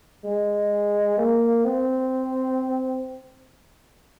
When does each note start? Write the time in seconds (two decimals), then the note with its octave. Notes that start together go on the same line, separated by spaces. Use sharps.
0.25 G#3
1.18 A#3
1.65 C4